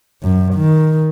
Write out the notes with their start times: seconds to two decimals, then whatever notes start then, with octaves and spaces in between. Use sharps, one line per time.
0.22 F#2
0.55 D#3